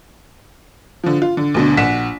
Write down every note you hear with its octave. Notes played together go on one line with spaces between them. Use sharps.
D3 F3
F4
D3
D2 B2 D3
A#1 F#5 B6 E7